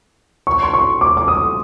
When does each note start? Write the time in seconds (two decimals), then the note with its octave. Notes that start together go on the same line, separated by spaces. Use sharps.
0.47 C#6
0.63 C6
0.74 C#6
1.01 D6
1.17 D6
1.28 D#6